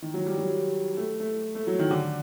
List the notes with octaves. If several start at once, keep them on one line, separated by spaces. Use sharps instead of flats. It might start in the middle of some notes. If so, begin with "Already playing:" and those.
D#3
F#3
G3
F#3
A3
A3
A3
F#3
D#3
D3